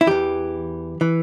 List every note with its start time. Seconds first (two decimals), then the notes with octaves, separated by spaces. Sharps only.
0.01 E4
0.07 E2 E3 G4
1.01 E3